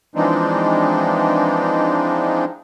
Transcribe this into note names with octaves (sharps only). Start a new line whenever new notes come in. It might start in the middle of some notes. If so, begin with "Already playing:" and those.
E3 F3 G#3 C4 D4 D#4